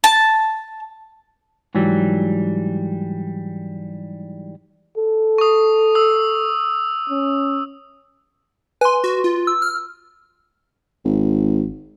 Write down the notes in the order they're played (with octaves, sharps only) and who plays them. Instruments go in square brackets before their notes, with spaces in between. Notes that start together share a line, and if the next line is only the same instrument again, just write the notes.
[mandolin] A5
[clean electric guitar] G#2 E3 F#3 G3
[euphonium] A4
[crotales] C#6 D#6
D#6 E6
[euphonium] C#4
[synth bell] B4 C6 [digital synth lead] G#5
[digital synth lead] F#4
F4
[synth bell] E6
[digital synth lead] F6
[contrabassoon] G#1